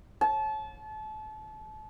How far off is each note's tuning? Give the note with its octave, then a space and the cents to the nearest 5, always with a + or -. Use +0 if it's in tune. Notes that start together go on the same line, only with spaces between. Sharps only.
A5 -30